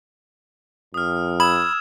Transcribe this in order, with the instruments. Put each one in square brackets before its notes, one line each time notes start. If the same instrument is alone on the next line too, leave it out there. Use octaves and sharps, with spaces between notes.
[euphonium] F2 [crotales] D#6 F6
[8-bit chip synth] B5 [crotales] D#6 G#6 E7 [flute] E6